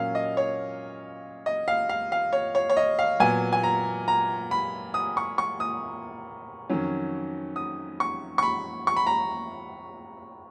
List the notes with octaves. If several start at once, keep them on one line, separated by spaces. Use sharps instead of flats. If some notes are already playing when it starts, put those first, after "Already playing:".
Already playing: A#2 F#3 A#3 C#4 F5
D#5
C#5
D#5
F5
F5
F5
C#5
C#5
C#5
D#5
F5
A#2 F#3 B3 G#5
G#5
A#5
A#5
B5
D#6
C#6
C#6
D#6
F2 D#3 F#3 C#4
D#6
C#6
C#6
B5
C#6
B5
A#5